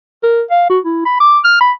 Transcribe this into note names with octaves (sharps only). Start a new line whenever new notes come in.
A#4
F5
F#4
E4
B5
D6
F6
B5